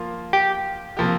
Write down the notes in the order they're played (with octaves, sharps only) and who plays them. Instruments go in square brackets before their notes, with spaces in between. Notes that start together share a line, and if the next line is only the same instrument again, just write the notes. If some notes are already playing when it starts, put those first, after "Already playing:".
Already playing: [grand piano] F3 A#3 F4
[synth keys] G4
[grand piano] C3 F3 A#3 G4